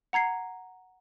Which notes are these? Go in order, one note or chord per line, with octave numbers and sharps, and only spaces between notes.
F#5 A#5 G#6 C7